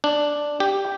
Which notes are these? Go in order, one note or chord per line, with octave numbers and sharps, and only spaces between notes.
D4
G4